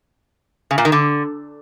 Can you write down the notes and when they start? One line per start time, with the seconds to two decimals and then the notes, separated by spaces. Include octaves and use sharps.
0.71 C#3
0.78 A#2
0.85 D#3
0.92 D3